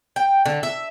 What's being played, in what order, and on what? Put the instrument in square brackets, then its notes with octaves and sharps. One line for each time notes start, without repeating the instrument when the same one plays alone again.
[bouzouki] G5
D3
E5